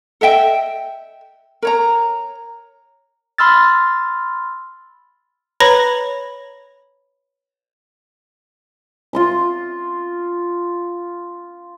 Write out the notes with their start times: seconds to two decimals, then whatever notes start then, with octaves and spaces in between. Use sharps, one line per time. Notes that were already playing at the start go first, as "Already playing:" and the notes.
0.21 A4 D#5 E5 G5
1.62 A#4 C#5 A#5
3.38 B5 C6 E6 F6 A6
5.60 B4 C#5 A#5 B5 A#6 F#7
9.13 F4 C6 D6